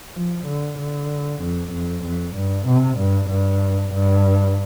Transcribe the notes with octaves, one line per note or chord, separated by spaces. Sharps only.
F3
D3
D3
F2
F2
F2
G2
C3
G2
G2
G2